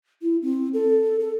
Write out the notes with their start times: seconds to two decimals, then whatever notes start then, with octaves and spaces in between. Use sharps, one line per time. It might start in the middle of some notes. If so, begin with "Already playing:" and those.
0.22 E4
0.42 C4
0.74 A4
1.20 A4